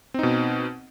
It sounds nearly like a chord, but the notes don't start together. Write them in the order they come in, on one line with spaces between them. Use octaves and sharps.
C4 D#4 B2